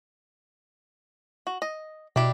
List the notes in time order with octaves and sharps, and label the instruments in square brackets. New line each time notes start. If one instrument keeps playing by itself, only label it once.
[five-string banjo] F#4
D#5
[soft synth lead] B2 [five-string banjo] D4 E4 G4